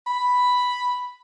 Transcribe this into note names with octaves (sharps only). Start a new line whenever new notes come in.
B5